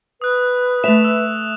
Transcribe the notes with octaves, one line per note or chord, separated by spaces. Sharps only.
B4 D#6 F#6
A3 E5 E7 F7
E6